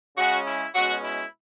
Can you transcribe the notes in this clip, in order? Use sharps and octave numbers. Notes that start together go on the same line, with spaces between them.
C#3 G#3 C#4 F#4
E4
B2 G#3 C#4 F#4
E4